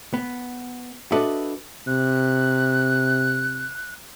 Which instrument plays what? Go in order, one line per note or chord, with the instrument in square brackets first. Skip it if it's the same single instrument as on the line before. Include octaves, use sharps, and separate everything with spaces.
[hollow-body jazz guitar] B3
D4 F#4 A4 B4 D#5 E5
[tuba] C3 [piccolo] F#6